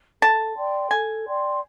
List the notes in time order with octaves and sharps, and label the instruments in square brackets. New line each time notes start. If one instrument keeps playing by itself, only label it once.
[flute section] A4 [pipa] A5
[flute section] D5 G5 C6
[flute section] A4 [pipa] G#5
[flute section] D5 G5 C6